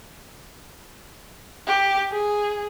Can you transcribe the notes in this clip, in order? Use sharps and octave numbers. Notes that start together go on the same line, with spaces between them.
G4
G#4